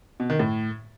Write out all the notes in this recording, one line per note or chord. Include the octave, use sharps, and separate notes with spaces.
B2
D#3
A2